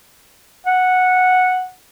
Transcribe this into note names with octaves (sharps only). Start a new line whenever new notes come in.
F#5